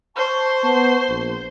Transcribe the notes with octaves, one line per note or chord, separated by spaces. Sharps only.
C5 A5 C#6
B3
A#1